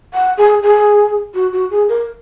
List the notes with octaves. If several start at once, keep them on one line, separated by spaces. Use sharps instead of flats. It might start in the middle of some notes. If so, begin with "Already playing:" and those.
F#5
G#4
G#4
F#4
F#4
G#4
A#4